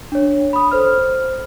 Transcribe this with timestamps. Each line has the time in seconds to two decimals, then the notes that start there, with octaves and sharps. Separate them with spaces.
0.12 D4 C#5
0.53 B5 D#6
0.71 A4 C5 F6